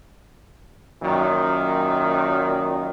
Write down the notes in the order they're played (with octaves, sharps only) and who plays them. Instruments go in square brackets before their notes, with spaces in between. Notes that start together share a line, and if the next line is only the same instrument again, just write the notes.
[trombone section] F#2 A#2 D#3